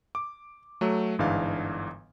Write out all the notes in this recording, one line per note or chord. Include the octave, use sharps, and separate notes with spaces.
D6
F#3 A3
G1 G#2 E3 D4 F5